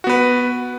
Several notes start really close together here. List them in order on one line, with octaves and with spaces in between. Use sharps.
F#4 B3 B4